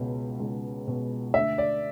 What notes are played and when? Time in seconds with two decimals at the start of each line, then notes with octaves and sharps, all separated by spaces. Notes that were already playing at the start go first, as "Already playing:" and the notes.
Already playing: C#2 B2
0.40 C#2
0.88 B2
1.34 D2 E5
1.58 D5